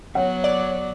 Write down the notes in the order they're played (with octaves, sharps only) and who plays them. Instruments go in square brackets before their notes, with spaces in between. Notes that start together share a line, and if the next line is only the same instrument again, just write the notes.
[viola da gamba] F#3 B3 [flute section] C#5 [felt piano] F#5
[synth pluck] D5